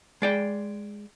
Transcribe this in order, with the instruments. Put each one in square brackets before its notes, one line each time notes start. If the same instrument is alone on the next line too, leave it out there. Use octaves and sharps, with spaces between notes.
[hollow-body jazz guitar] G#3 D5 G5